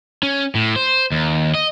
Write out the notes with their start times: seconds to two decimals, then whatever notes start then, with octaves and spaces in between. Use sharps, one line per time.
0.23 C#4
0.55 A2
0.76 C5
1.12 D#2
1.54 D#5